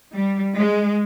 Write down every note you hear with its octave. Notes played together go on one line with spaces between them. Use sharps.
G3
G#3